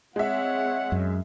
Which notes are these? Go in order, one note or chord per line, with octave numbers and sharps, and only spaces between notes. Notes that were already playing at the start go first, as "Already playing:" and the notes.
G#3 C4 C#5 E5 F#5
F#2